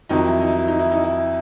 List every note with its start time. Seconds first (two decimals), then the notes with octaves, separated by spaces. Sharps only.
0.09 F2 C3 D#3 F#3 D#4
0.25 E4
0.41 D#4
0.57 E4
0.68 D#4
0.80 E4
0.92 D#4
1.04 E4